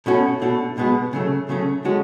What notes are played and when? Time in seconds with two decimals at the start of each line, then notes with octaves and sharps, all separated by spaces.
0.06 B2 A3 C#4 F#4
0.42 B2 A3 D4 F#4
0.77 B1 B2 G#3 B3 F#4
1.13 C#3 F#3 A3
1.49 C#3 F#3 A3 C#4
1.85 D3 G#3 C#4 F#4